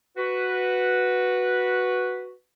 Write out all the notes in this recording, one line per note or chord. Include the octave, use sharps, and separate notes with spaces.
F#4 B4